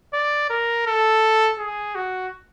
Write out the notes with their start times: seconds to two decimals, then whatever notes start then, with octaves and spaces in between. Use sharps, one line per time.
0.14 D5
0.50 A#4
0.87 A4
1.59 G#4
1.95 F#4